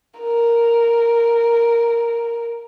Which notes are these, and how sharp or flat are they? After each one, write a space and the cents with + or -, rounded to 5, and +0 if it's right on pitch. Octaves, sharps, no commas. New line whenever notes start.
A#4 +0